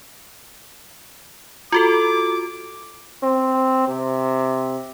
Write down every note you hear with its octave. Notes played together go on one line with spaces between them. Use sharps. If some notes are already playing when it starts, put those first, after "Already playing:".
F4 F#4 A4 D6
C4
C3